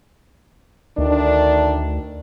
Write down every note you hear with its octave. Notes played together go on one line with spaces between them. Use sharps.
D2 D#3 A3 D4